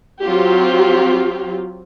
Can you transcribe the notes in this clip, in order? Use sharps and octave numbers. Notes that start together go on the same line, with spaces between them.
F#3 C4 F4 G4